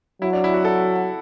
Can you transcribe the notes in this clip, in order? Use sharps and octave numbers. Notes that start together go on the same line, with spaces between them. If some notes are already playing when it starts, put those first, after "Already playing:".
F#3 E4
D4
E4
F#4
A4